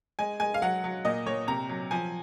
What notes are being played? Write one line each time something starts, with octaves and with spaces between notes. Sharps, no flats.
G#3 G#5
G#3 G#5
F5
F#3 F#5
F#3
A#2 D#5
A#2 C#5
C3 A#5
F#3
F3 G#5